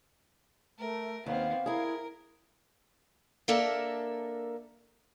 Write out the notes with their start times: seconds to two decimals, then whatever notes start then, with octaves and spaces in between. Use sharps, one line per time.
0.79 A3 A#4
1.26 D#2 B3 C4 F5
1.66 E4 G#4 A#4
3.48 A#3 D4 A4 A#4 E5